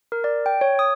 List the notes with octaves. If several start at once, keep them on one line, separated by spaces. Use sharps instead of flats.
A#4
D5
G5
C#5
D#6